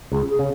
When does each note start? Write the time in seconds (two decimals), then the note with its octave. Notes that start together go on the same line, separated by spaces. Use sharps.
0.12 C#2 G#4
0.30 G#4
0.39 C#3